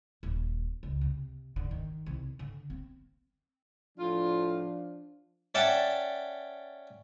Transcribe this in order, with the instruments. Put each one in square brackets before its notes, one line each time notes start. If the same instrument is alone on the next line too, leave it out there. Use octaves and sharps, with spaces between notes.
[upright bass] D#1
C#2
C3
D3
D#3
C2
D3
C4
[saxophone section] A2 F4 [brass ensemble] F3 D4
[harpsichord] C#4 D5 E5 F#5 G5 A5